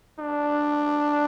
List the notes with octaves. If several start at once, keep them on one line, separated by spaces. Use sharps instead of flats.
D4